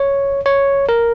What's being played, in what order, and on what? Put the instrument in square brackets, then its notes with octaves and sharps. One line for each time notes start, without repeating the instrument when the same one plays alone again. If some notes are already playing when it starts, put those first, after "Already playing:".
Already playing: [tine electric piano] C#5
C#5
A#4